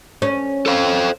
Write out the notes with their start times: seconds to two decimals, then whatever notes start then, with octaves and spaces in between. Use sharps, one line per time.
0.22 C#4
0.66 A4 C5 F5